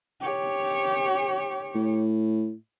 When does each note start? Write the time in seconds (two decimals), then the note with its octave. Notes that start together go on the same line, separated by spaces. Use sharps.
0.21 G4 C#5
1.75 A2